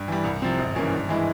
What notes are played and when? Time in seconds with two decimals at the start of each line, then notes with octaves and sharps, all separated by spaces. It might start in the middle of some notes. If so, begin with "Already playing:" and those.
Already playing: G2
0.08 E3 G3
0.24 C2
0.42 C3 F3 C4
0.58 G#1
0.75 G2 E3 A#3 C#4
0.92 G2
1.09 E3 G#3 E4